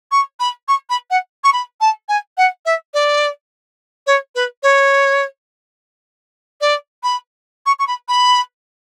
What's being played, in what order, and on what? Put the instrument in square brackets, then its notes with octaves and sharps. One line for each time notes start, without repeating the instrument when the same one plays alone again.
[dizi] C#6
B5
C#6
B5
F#5
C#6
B5
A5
G#5
F#5
E5
D5
C#5
B4
C#5
D5
B5
C#6
C#6
B5
B5